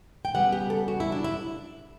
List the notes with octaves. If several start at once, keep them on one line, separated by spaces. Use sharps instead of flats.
G5
C#3 G3 B3 F#5
G4
A4
F#4
E4
D4
E4